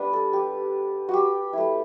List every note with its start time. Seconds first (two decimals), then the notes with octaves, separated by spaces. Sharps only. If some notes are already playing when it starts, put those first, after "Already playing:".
Already playing: G3 B3 D4 B4
0.13 A4
0.33 G4
1.09 F#4 G4
1.53 A3 E4